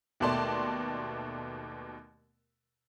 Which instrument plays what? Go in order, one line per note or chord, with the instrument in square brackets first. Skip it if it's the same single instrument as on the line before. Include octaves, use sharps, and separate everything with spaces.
[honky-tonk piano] D#2 B2 A3 D5 A5 C6